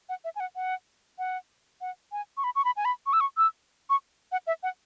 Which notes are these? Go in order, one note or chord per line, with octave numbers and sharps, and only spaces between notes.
F#5
E5
G#5
F#5
F#5
F#5
F#5
G#5
C#6
B5
C#6
B5
G#5
B5
C#6
E6
C#6
E6
C#6
F#5
E5
F#5